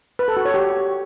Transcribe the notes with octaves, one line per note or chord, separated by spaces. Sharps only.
B4
A4
F#4
C#5
G4